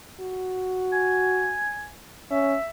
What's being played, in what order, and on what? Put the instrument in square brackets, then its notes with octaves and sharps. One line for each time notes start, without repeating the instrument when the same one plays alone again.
[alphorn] F#4
[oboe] G#5
[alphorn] C#4 [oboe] E5